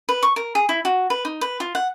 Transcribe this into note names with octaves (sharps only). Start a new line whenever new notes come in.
B4
C#6
A#4
G#4
E4
F#4
B4
D#4
B4
F4
F#5